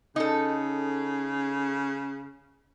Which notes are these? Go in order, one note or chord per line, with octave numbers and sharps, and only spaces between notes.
C#3 D#4 A4